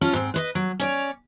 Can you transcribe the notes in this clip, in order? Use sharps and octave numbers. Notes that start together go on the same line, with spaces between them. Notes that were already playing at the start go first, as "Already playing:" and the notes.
F3 C#4 F4
G#2 C4
B4 C5 D#5
F#3
C#4 C#5 D5